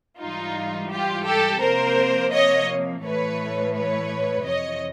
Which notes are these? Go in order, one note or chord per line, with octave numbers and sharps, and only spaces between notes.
G#2 E3 G3 D#4 F4
F4 G4
G4 A4
C3 F3 A#3 A#4 C5
C#5 D#5
A2 E3 A3 B4 C#5
B4 C#5
F2 C3 E3 C#5 D#5